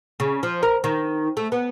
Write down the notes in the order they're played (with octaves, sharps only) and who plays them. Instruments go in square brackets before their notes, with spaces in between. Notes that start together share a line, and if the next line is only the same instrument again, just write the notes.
[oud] C#3
F3
A#4
D#3
A3
B3